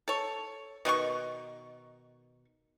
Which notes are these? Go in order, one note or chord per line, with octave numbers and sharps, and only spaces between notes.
A4 C#5
B2 D#3 C4 C#6